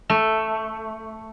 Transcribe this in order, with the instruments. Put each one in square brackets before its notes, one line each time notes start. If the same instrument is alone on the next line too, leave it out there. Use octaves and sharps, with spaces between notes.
[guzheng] A3